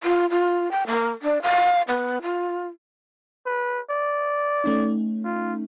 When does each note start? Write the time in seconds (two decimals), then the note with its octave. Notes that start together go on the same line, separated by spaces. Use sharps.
0.04 F4
0.30 F4
0.71 G5
0.87 A#3
1.22 D4
1.42 F5
1.88 B3
2.22 F4
3.46 B4
3.90 D5
4.64 A3 C#4 D#4
5.25 F4